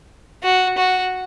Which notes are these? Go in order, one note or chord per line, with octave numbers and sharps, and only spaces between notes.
F#4
F#4